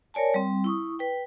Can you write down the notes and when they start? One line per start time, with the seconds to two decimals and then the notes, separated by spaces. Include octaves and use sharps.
0.14 A#4 C#5 D5 G#5 A5
0.34 G3 C4
0.64 E4 C#6 D#6
0.99 B4 G5